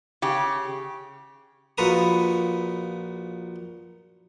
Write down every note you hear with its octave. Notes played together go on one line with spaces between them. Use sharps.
C#3 G4
A#1 F4 F#4 B4 A#5 D#6